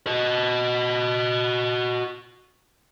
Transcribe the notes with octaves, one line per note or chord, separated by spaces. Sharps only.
F#4 D#5